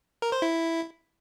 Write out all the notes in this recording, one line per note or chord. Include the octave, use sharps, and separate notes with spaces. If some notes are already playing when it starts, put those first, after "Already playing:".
A#4
C5
E4